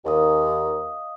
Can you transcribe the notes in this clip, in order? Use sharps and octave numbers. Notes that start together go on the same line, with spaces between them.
D#2 D#5 F5 D#6